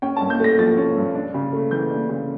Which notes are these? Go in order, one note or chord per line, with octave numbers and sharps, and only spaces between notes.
C#4 G5
A5
G2
G6
A3 A#6
F3 A6
C#4
G2
D4
C#3
A3
E3 G6
D4
C#3